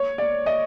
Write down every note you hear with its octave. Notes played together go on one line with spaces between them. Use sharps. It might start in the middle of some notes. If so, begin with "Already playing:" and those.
Already playing: C#5
D5
D#5